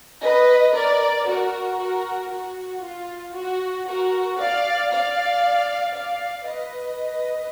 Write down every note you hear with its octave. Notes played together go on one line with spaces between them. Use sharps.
B4 D#5
A#4 D5
F#4 A#4
F#4 A#4
F#4
F4
F#4
F#4 A#4
D5 F5
D5 F5
D5 F5
B4 D#5